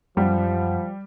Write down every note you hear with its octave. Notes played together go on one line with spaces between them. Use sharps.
F#2 F3 G3 F#5